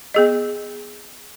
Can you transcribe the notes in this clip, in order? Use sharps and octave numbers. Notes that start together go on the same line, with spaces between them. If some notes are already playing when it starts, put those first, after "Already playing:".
B3 G#4 D#5